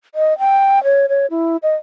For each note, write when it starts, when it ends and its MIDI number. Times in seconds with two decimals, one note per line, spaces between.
0.15 0.37 75
0.39 0.83 79
0.84 1.06 73
1.09 1.26 73
1.30 1.57 64
1.63 1.75 75